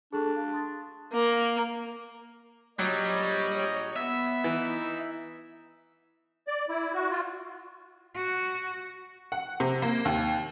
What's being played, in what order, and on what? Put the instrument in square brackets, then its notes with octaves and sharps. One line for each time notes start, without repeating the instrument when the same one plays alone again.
[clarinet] D4 [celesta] G#4 A4 C#6
[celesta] F5
C6 D#6 A6
[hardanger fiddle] A#3
[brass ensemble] A#1 C#5 [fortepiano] F#3 [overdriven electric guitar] G3 [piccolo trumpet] D#5
[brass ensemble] B3 [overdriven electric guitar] E5
[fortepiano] E3 [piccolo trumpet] D#4
[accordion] D5
E4
F#4
F4
[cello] F#4
[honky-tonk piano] F#5
C3
A#3
D#2